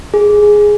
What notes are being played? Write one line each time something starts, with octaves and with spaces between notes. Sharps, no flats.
G#4